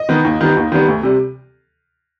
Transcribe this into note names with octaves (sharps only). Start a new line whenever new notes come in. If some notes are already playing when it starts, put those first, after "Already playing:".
Already playing: D#5
D#3 B3
D#2
D#3 G3 B3
D#2
D#3 G3 B3
D2
C3 G3